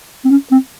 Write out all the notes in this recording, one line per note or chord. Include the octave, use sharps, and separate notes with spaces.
C4
C#4
C4